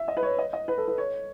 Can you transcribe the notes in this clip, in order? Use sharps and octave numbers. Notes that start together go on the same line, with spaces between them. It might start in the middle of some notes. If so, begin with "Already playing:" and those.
Already playing: E5
D#5
B4
C#5
D#5
D#5
B4
A4
B4
C#5